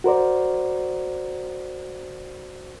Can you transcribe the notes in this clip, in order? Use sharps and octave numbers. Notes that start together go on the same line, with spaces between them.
F#4 A#4 C5 D5